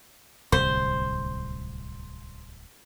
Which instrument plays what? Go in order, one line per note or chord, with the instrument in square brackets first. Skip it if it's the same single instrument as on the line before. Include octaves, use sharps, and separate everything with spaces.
[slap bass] D1 C2 C3 [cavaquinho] C5